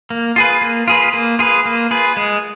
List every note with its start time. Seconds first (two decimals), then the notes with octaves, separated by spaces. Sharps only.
0.10 A#3
0.36 F4 G#4 B4
0.62 A#3
0.88 F4 G#4 B4
1.14 A#3
1.39 F4 G#4 B4
1.65 A#3
1.91 F4 G#4 B4
2.17 G#3